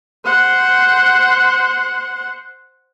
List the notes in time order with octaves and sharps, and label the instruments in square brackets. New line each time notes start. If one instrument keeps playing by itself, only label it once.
[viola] C5 F#5